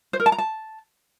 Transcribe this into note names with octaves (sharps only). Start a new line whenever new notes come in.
C5
A#4
A5
A#5
A5